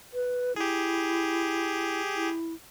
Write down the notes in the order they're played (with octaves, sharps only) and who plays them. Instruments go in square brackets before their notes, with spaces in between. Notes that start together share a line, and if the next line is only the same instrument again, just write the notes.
[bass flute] B4
[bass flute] E4 [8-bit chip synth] G4 G#4
[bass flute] E4